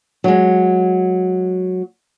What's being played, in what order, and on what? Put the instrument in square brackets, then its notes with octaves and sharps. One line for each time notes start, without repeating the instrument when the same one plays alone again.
[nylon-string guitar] F#3 G#3